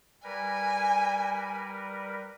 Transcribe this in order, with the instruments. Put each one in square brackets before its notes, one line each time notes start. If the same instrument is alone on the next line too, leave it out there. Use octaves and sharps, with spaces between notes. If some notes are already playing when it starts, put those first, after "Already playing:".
[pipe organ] G3 A#4 B4 [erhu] G#5